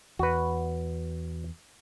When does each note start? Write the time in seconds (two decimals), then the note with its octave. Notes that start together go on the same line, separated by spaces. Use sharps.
0.19 E2 F#4 B4